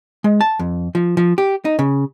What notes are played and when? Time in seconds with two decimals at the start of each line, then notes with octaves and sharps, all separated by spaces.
0.24 G#3
0.41 A5
0.59 F2
0.95 F3
1.17 F3
1.38 G4
1.65 D#4
1.79 C#3